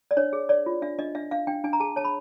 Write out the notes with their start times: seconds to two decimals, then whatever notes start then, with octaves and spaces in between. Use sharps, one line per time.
0.11 D5
0.17 D4 C#5
0.33 G#4
0.49 C#5 D5
0.66 F4
0.82 D4 E5
0.99 D4 D#5
1.15 D4 E5
1.31 D4 F5
1.47 D4 G5
1.64 D4 G#5
1.73 A#5
1.80 G#4 A5
1.96 C#5 A5
2.05 B5